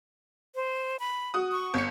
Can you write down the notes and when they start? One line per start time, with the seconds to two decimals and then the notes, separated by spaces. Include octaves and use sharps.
0.55 C5
1.00 B5
1.34 F#4 D#6
1.52 C#6
1.74 G1 C#7